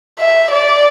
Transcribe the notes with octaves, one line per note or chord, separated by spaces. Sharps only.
E5
D5